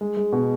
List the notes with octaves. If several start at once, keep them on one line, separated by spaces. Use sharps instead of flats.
G#3
G#3
B2